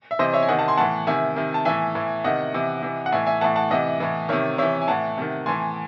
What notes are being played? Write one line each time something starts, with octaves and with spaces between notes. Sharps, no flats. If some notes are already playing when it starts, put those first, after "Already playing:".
E5
C3 E3 C5 D#5
C#5 E5
G#5
C3 D#3 D#5 F#5
F#5 A5
G#5 C6
A2 E3 F#5 A5
C3 D#3 E5 G#5
C3 D#3
A5
A2 E3 E5 G#5
A2 E3
C3 D#3 D#5 F#5
C3 E3
C3 E3
F#5
A2 E3 E5 G#5
E5 G#5
A2 E3 F#5 A5
F#5 A5
C3 E3 D#5 F#5
A2 E3
C3 D#3 C#5 E5
C3 E3 C#5 E5
G#5
A2 E3 F#5 A5
C3 D#3
A2 E3 G#5 C6